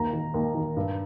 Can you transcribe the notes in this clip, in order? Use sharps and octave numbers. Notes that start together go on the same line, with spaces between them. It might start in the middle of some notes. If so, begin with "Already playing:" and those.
Already playing: D#2 A#5
D#3
D#2
D#3
G2